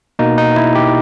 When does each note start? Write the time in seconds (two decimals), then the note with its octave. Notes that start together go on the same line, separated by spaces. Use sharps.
0.19 B2 A#3 D#4
0.38 D#4
0.56 E4
0.75 G4